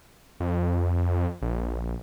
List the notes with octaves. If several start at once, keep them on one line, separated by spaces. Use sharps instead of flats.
F2
A#1